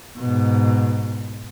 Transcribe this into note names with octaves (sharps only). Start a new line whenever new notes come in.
G#2 B2